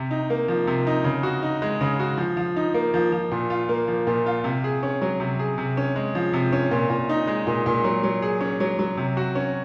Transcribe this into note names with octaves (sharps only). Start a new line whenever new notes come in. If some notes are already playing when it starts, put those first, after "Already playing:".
Already playing: C3
D#4
A#3
F3
C3
D#4
C#3
F#4
D#4
G#3
C#3
F#4
F3
F3
D#4
A#3
F3
F3
A#2
F4
A#3
F3
A#2
F4
C3
G#4
C#4
F#3
C3
G#4
C3
C#4
G#3
F3
C3
C#4
A#2
A#2
D#4
G#3
A#2
A#2
F#3
F#3
G#4
C#4
F#3
F#3
C3
F#4
C#4